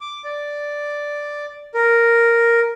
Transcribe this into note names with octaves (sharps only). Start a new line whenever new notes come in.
D6
D5
A#4